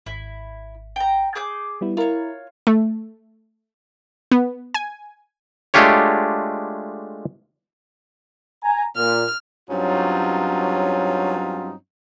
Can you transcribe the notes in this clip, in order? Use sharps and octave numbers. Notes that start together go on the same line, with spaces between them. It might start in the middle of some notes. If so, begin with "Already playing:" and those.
G#1 E4
G5 A#5
G#4 D6 G6
G3 B3 E4
E4 F4 A#4 C#5
A3
B3
G#5
G#3 A3 D4 F4 G4 C#5
G#5 A#5
A#2 F6
G2 F#3 C4 C#4 D#4 F4